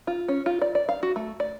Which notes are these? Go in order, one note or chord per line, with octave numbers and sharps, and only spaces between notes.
F4
C#4
F4
D5
D5
F5
F#4
A3
D5